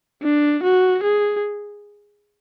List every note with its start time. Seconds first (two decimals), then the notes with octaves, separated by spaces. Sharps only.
0.22 D4
0.63 F#4
1.03 G#4